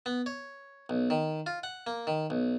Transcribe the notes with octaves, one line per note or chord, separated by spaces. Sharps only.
B3
C#5
B1
D#3
F4
F#5
A#3
D#3
B1